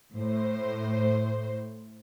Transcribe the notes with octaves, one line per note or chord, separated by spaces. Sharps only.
A2 C5